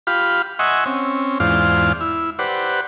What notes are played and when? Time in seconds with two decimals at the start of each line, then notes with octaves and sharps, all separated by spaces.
0.07 F4 G4 F5 B5
0.59 D#5 E5 F#5 G#5 C6 C#6
0.86 C4 C#4
1.40 E2 G#2 F4 C5 D5 F5
2.01 E4
2.39 G4 B4 C5 D5 F#5